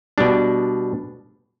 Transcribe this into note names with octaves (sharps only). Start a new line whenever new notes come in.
B2 G3 D4